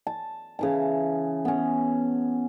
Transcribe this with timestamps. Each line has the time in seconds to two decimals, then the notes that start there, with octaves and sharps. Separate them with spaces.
0.07 A5
0.59 C#3 E3 A5
1.45 B3 C#4